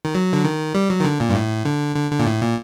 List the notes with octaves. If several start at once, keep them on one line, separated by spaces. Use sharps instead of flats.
D#3
F#3
D3
D#3
G3
F#3
D#3
D3
A#2
G2
A2
D3
D3
D3
A#2
A2
A#2